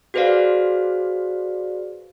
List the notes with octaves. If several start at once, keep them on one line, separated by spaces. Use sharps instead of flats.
F#4 G#4 B4 C5 D5 F5